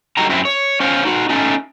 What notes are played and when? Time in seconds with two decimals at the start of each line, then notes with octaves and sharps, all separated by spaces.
0.17 D3 G3 D#4 F#4 A#5
0.29 F#2 F#3 C4 E4
0.45 C#5
0.80 C#4 C5 C#5 F5
1.05 D#4 F#4
1.29 A3 C#4 D#4